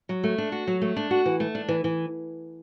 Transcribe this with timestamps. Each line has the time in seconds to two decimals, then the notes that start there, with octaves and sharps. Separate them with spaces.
0.09 F#3
0.24 A3
0.38 D4
0.52 F#4
0.67 F#3
0.81 A3
0.96 D4
1.11 F#4
1.26 E3
1.40 A3
1.55 D4
1.68 E3
1.84 E3